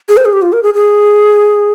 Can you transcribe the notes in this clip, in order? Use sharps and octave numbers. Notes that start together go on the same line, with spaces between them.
G#4
C5
G#4
G4
F4
A#4
G#4
G#4